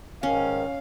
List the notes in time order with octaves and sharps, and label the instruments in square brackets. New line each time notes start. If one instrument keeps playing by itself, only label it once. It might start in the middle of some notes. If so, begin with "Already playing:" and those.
[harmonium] G#2 D#3 [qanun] C#4 [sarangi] F5